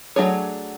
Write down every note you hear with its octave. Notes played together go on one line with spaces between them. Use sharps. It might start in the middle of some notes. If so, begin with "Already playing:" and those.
F#3 A3 D4 G#4 C#5